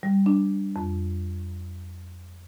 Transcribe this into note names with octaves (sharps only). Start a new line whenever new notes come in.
G3
D4
F2